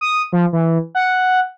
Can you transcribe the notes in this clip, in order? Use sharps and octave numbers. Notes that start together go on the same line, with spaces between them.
D#6
F3
E3
F#5